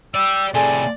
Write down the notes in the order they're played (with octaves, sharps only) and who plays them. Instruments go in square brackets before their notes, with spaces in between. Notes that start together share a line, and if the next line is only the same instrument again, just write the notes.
[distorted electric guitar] G4 D5 [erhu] E6
[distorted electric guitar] A2 C3 [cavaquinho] G#4 A4 C6 [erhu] D5